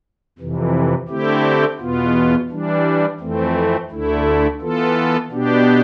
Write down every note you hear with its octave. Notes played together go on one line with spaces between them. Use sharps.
F2 C3 E3
D3 A3 C4 E4 G4
E2 B2 B3 F4
E3 G3 D4
F2 E3 A3 C4
D2 D3 A3 E4
E3 B3 F4 A4
B2 B3 D4 G4